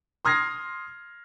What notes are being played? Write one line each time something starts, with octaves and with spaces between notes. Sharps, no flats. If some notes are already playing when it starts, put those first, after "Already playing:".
C6 D#6 F6 G#6 A#6 C7